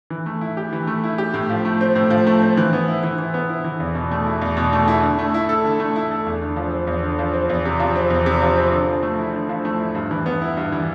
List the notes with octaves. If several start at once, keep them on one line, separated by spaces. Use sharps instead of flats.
E3
A3
E4
G4
E3
A3
E4
G4
A2
F3
A3
C4
A2
F3
A3
C4
E3
B3
E4
E3
E3
B3
E4
E3
E2
B2
A3
E4
E2
B2
A3
E4
D3
A3
E4
A4
D3
A3
E4
A4
E2
D3
F3
C4
E2
D3
F3
C4
E2
C3
F3
C4
E2
C3
F3
C4
D3
F3
A3
E4
D3
F3
A3
E4
G2
E3
B3
E4
G2
E3